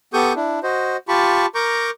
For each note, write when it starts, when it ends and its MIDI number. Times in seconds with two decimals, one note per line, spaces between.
0.14 0.33 59
0.14 0.33 67
0.14 0.33 69
0.14 0.33 85
0.14 0.33 87
0.14 0.33 91
0.36 0.60 62
0.36 0.60 64
0.63 0.97 66
0.63 0.97 72
0.63 0.97 75
1.08 1.46 65
1.08 1.46 67
1.08 1.46 81
1.08 1.46 83
1.08 1.46 85
1.55 1.90 70
1.55 1.90 82
1.55 1.90 85
1.55 1.90 86
1.55 1.90 91